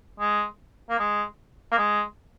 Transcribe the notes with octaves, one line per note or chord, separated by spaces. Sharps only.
G#3
A#3
G#3
A#3
G#3